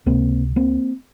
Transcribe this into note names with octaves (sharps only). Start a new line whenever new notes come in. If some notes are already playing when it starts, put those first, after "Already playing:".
C#2 C3 A#3 C4
A#3 C4